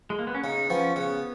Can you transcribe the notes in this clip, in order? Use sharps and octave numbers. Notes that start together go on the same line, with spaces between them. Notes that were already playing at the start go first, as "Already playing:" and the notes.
G#3
A#3
B3
C#4
C#3 D#4
F3 B3 C#4
C#3 B3